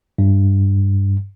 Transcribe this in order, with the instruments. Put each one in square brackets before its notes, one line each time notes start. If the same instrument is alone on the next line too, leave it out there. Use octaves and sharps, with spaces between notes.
[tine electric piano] G2